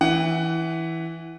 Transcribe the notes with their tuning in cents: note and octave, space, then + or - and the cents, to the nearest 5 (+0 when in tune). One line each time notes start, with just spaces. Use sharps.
E3 -5 F#5 +15